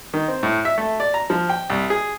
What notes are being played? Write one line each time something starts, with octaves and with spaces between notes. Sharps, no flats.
D#3
C4
A2
E5
A3
D5
A#5
F3
G5
C2
G#4